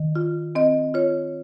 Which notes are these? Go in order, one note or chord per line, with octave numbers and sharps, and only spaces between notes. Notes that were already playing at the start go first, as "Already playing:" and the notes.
Already playing: D#3
F4
C4 D#5
F4 C#5